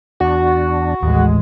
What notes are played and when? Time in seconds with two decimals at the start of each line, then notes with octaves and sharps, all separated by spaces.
0.20 E2 D4 F#4
1.03 A1 D#2 G#3